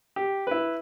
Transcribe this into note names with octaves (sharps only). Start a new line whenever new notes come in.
G4
E4 B4